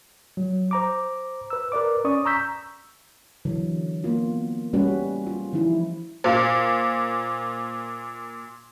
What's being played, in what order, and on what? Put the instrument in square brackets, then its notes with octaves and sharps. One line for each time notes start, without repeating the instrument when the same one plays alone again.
[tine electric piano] F#3
C5 A#5 D6
B4 E6
A#4 B4 D5 D6
C#4 D5 C#6 D#6
A#5 C#6 E6 G6 B6
[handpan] D3 E3 F#3
A#3 B3 F4
G3 A3 C#4 F#4 B4
F4
E3 F3 D#4 E4
[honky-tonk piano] A#2 [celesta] C5 F5